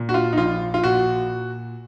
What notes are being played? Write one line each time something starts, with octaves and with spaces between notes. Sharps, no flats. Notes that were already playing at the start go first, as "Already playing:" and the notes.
Already playing: A#2
F#4
F4
D#4
A#1 F4
F4
A#2 F#4